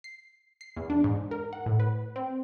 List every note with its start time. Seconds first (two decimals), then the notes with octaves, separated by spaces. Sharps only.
0.04 C7
0.61 C7
0.77 E2
0.90 D4
1.04 G#2
1.31 A#4
1.53 F#5
1.66 A2
1.80 B4
2.16 C4